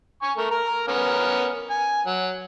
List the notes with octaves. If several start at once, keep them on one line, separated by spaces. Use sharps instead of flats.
G#5 C#6
A3 A#4
A#4 A#5
B3 C#4 A#4
G#5
F#3